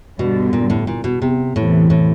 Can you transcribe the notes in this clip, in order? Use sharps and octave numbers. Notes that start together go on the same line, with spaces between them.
G2 B2 D3 G3
A#2
A2
A#2
B2
C3
E2 A2 C3 E3
A2